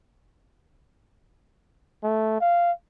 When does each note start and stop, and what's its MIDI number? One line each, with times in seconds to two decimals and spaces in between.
2.04 2.38 57
2.41 2.72 77